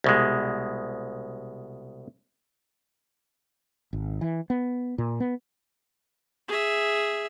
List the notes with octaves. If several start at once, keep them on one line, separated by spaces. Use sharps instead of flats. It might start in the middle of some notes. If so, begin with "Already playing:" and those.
C2 B2 G#3
G#1
E3
B3
A#2
B3
G#4 E5